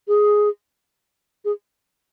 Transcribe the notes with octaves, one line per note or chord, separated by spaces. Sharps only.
G#4
G#4